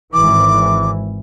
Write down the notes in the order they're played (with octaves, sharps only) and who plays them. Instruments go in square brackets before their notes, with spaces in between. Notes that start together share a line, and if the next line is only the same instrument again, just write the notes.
[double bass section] G#1 E3 [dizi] D6